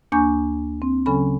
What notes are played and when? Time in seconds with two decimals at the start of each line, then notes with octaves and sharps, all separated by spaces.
0.12 D2 A#3 D4 G#5 C#6 G6
0.82 C4
1.06 C#3 F#3 C#4 A4 G#5 B5